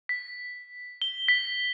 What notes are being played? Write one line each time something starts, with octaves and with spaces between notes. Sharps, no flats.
B6
G7
B6